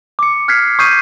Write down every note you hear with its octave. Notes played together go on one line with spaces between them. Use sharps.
D6 C#7
F6 F#6 G#6 B6 C7
C#6 D#6 G6 C7 D#7